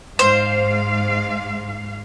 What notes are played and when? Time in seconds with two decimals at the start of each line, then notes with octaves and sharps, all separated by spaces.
0.19 G#2 C5 F5